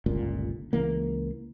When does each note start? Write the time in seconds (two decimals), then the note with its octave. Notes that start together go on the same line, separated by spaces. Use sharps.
0.06 G1 C#2 A#2
0.73 C#2 E3 A#3